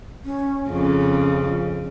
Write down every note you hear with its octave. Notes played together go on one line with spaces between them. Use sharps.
C#4
F2 C#3 C#4